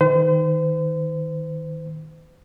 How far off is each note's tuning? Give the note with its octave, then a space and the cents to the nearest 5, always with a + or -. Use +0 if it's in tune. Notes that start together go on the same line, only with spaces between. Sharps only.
D#3 +15 C5 -40